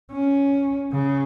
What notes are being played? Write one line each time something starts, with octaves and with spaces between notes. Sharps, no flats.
C#4
C#3